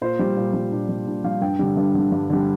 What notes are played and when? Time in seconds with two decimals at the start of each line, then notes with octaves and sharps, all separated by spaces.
0.01 A#2 C5
0.19 G3
0.37 A#2
0.54 G3
0.71 A#2 D4
0.89 G3
1.06 A#2 D4
1.24 G3 F5
1.41 G2 G5
1.59 D3 G3
1.77 G2
1.94 D3 G3
2.12 G2
2.30 D3 G3